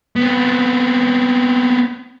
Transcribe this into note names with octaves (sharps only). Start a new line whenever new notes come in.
B3 C4